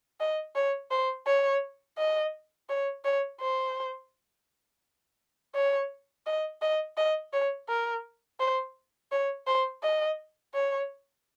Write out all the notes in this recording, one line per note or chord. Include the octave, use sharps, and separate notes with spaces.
D#5
C#5
C5
C#5
D#5
C#5
C#5
C5
C#5
D#5
D#5
D#5
C#5
A#4
C5
C#5
C5
D#5
C#5